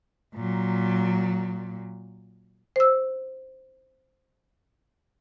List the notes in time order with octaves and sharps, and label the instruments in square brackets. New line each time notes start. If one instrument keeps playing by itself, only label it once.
[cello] A#2 F#3
[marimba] C5 E6